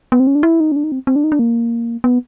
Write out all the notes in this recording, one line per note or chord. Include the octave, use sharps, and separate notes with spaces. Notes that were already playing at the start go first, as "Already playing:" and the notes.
B3
C4
C#4
D4
E4
D#4
C#4
D4
D#4
C4
C4
D4
D#4
D4
A#3
B3